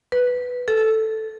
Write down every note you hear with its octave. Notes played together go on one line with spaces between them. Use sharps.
B4
A4